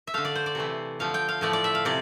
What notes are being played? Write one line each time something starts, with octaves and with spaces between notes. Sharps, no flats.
E5
D3 A3 F5
D5
C5
D5
C3 E3 A3
D3 F3 A3 F5
G5
F5
A2 F3 A3 D5
D5
E5
F5
C3 D5